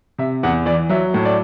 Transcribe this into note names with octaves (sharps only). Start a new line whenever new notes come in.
C3 E5
E2 F#5
E3 D5
F#3 E5
A2
D5